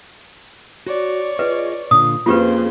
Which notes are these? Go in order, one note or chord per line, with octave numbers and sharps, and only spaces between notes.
F#4 C#5 D5
F4 G#4 B4 D#5
A#2 D3 F4 D#6
F2 C#3 A#3 F4 G4 B4 C5